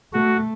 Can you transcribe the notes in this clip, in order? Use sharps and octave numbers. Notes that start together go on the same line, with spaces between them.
A3 F#4